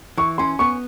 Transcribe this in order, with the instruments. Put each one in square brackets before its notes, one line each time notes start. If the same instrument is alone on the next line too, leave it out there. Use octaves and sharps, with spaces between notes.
[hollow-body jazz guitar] E3 [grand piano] C#6
[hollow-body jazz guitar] C#4 [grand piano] C6
[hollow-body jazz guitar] B3 [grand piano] C#6